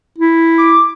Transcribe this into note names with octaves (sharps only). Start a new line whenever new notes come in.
E4
D6